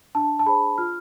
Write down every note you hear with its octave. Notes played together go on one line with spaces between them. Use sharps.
D4 A5
A5
G#4 C5 B5
F4 F6